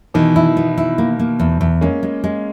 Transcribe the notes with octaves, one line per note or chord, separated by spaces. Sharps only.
B2 D#3 E3
E4
B3
E4
A#3
A#3
E2
E2
G#3 A#3 C#4
G#3
G#3